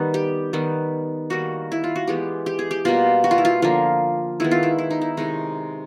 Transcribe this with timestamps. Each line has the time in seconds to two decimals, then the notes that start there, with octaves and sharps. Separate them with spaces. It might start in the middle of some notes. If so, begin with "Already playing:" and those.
Already playing: D#3 G3 B3
0.14 G4
0.53 D#3 G3 B3
1.30 D#3 G3 A#3 F#4
1.72 E4
1.84 F4
1.96 F#4
2.08 E3 G#3 B3 G4
2.46 G4
2.59 G#4
2.71 G4
2.85 B2 G3 A#3 F4
3.24 F#4
3.31 F4
3.38 E4
3.45 F4
3.62 D3 F3 A#3 F4
4.40 D#3 G#3 B3 E4
4.51 F4
4.63 E4
4.78 E4
4.91 D#4
5.01 E4
5.17 C3 D#3 G#3 D#4